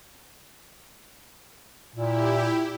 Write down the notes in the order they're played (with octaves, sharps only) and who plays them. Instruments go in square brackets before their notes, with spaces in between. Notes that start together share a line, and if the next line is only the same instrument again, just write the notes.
[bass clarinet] A#2 [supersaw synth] E4 G4